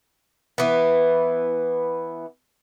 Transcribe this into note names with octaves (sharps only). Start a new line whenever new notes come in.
E3 B3